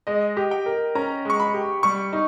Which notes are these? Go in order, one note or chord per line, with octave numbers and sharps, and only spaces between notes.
G#3 D#5
G4
G5
A#4
C#4 A#5
G#3 C#6
B5
G4
G3 C#6
D#4